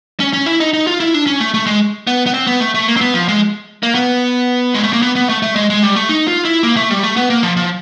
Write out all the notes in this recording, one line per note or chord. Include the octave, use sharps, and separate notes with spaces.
C#4
C#4
E4
D#4
D#4
F4
E4
D4
C#4
A3
A3
G#3
B3
B3
C4
B3
A3
A3
A#3
C4
B3
F3
G#3
A#3
B3
G#3
A3
A#3
B3
B3
A3
A3
G#3
G#3
G3
A3
D#4
F4
E4
A#3
A3
G3
A3
B3
A#3
F3
F3